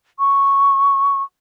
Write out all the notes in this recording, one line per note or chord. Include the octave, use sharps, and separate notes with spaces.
C#6